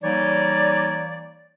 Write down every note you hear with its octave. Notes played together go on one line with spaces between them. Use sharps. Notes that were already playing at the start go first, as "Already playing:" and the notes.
E3 G3 A#3 D#4 C#5 D5